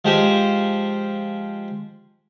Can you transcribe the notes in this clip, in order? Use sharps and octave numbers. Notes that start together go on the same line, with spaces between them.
F3 G#3 G4 C5